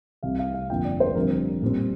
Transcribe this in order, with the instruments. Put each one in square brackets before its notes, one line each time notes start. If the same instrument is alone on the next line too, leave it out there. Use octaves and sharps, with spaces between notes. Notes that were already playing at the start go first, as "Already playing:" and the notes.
[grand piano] C2 C3 G3 F5
F5
F5
G1 F2 D3 A#3 F4 G5
D5
C5
F1 F2 D3 G3 C4 A#4
A#2 G3 C4